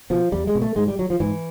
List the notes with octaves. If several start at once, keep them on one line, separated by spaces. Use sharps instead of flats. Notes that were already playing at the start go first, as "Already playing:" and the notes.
B2 F3
E2 G3
G#3
B2
A3
G#2 G#3
G3
F#3
F3
G#2 E3